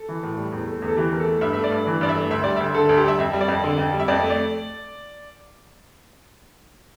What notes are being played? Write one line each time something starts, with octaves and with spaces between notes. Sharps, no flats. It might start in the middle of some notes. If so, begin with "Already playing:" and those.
Already playing: A4
E3
A2
G3
E2
A3
E2
A4
E3 G4
E2 A#4
A4
A3
G2 E5
A3 E5
D5
G2
E3
G2 D5
E5
A3
D2 E5
G3 D5
D2 E5
D3 A4
D2 A4
G4
G3 E5
F2 E5
G3
D5
F2
D3
F2
G3
E5
F2 D5
A3
D5